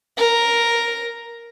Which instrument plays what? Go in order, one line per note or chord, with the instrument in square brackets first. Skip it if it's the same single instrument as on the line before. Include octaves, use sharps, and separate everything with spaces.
[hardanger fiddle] A#4